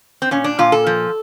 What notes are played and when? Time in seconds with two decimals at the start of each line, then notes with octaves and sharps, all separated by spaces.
0.22 C4
0.31 A#2 C#4
0.44 D4
0.59 A#2 F4
0.72 A4
0.87 F3